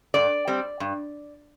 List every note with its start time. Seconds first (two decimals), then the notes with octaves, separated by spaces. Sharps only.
0.14 G2 D5
0.48 G3 C4
0.80 G2